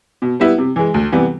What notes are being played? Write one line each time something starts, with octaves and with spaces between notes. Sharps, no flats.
B2
G3 B3 E4
C3
E3 G#3
D2
C3 E3 G3 B3